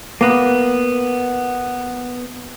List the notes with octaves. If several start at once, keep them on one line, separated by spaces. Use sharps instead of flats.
A#3 B3